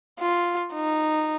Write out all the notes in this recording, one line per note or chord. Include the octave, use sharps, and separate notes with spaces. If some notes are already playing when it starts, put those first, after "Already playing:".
F4
D#4